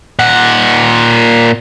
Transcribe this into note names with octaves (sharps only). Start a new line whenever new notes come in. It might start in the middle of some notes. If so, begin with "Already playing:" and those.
A#2 F#5